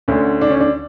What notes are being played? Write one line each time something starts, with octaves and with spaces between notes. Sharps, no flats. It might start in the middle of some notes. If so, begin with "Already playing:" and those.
D2 D3 C#4
D4
C#4
D4